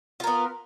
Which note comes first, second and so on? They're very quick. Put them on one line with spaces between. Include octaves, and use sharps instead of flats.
F4 A#4 B3